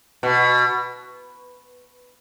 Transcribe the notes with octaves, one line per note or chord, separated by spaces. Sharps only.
B2